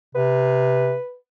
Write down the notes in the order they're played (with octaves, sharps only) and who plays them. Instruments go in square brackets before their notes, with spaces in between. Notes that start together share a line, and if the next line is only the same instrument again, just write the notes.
[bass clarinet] C3 [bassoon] B4